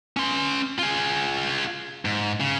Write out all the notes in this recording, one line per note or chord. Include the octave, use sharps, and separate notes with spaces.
C#4 C6
F4 G#4
G#2
C#3